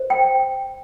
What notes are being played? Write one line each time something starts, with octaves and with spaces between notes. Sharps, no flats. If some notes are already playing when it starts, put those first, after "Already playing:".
Already playing: C5
G5